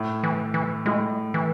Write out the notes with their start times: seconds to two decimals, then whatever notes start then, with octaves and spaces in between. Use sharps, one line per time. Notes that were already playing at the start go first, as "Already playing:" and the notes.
Already playing: A2
0.23 E3
0.54 E3
0.86 A2 G#3
1.34 E3